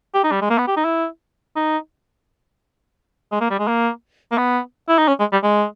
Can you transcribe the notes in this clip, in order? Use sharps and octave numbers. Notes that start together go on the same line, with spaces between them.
G4
D#4
G3
G#3
A#3
B3
G4
D#4
E4
D#4
G#3
A#3
G3
G#3
A#3
A#3
B3
E4
D#4
C#4
G#3
G3
G#3